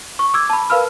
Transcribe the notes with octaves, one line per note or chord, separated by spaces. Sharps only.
C#6
D6 E6 G#6
A5 B5
A#4 B4 F5 B5 E6 F6